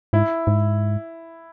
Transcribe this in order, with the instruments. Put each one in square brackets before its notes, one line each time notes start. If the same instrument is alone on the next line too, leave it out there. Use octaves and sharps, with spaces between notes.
[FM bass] G#2 [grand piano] E4
[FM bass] G#2